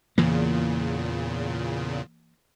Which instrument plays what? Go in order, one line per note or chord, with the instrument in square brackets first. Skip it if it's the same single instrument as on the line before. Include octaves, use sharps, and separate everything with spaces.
[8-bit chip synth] E2 A#2 C#3 [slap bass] E3 A#3